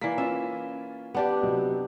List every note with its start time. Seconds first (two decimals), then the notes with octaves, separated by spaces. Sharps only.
0.01 E3 A#3 D5 B6
0.18 C#4 F4 E5
1.14 B3 D4 G4 F#5
1.43 C3 F#3 D#5